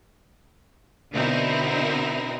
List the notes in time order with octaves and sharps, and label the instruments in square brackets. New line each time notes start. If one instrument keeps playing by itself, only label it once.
[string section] B2 D3 C4 D#4 E4 A#4